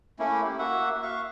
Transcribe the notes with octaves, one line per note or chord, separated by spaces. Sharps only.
A3 A#3 C#4 E4
E4 G4
A#3 F#4 E5 F#5
E5 F5 C#6